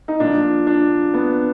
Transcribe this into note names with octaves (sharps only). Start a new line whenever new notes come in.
D#4
A#2 F3 D4
D4
B3